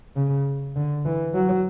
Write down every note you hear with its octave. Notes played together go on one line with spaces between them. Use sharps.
C#3
D3
E3
F#3